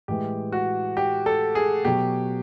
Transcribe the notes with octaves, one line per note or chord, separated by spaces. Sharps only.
A2 E3 G#3 G4
F#4
G4
A4
G#4
B2 F#3 G4